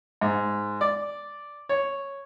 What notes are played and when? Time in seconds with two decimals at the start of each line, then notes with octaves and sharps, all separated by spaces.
0.21 G#2
0.81 D5
1.69 C#5